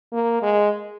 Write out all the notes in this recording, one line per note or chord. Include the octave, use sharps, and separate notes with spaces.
A#3
G#3